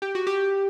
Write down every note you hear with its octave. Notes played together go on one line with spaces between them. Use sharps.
G4
F#4
G4